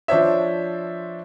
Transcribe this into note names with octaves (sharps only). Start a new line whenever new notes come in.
F3 D4 C5 C#5 E5